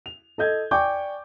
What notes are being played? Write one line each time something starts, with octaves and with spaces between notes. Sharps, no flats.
F7
A4 D#5 G6 G#6
D5 G5 G#5 C#6 D6 G6